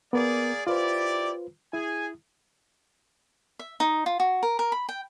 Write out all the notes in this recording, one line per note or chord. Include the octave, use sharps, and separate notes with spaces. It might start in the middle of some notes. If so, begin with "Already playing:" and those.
A#3 B3 G#4 A#4 D5
E4 F4 G4 B4 C5 D5
E4 G#4 G#5
E5
D#4
F4
F#4
A#4
A#4
B5
G5